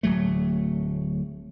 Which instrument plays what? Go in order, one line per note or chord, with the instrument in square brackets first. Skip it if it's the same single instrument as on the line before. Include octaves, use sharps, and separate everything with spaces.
[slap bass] D1 F#3 A3